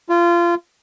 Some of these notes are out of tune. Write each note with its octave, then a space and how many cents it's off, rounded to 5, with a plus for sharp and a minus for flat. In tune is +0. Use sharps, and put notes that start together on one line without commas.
F4 -25